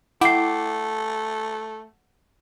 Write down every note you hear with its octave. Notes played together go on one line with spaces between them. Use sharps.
A3 E4 F#5 G5 D6 C7